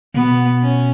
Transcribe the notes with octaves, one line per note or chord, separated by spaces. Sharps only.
B2 B3
C#4